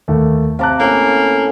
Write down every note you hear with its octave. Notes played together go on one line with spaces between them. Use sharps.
D#2 A3
C3 F5 A5 A#5 D6 F#6
A2 A#3 C#4